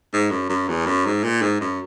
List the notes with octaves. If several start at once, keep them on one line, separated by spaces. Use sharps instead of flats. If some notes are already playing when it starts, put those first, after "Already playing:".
G#2
F#2
F#2
E2
F#2
G#2
A#2
G#2
F#2